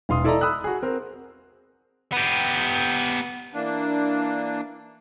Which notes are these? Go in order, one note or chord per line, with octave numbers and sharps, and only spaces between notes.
E1 F5 C6 D#6
E4 A4 D5 D#5 A5 A#5
B5 D#6 E6 F#6
F#4 G#4
C4 A#4
B3 G4
E3 A#3 D4